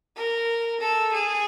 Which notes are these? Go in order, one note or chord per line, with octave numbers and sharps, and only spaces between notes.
A#4
A4
G#4